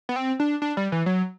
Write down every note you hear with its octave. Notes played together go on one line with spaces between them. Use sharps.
B3
C4
D4
D4
G3
E3
F#3